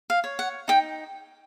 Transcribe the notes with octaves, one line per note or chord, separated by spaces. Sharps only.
F5
C#5
F#5
D#4 G5